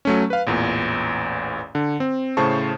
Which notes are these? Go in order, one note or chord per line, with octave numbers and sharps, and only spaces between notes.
F#3 A3 C#4
B4 F5
A1 E2 A#2
D3
C4
A2 C#3 C5 A5 C#6